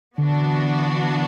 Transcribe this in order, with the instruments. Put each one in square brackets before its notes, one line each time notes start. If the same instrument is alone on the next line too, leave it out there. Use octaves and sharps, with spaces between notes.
[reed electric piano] D3 [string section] E3 B3 D4 F#4